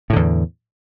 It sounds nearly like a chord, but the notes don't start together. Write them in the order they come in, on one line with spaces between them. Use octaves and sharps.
A2 D3 E2